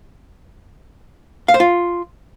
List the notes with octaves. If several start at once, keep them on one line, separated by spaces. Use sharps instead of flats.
F5
C5
F4